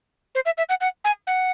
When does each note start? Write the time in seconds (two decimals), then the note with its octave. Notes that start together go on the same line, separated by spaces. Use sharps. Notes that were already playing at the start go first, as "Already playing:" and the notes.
0.35 C5
0.46 E5
0.58 E5
0.69 F#5
0.81 F#5
1.04 G#5
1.27 F#5